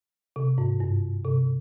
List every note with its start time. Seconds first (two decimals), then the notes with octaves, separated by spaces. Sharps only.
0.36 C3
0.58 G#2
0.80 G2
1.24 C3